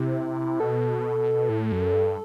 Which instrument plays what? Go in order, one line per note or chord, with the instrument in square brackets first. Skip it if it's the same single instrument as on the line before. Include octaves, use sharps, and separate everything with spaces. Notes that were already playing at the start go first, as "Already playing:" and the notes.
Already playing: [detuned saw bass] C3 [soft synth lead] E4
[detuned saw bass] B2 [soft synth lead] A4
[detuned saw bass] A2
F#2
G2